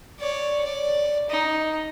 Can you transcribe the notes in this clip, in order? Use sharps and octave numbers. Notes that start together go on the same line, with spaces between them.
C#5 D5
D5
D#4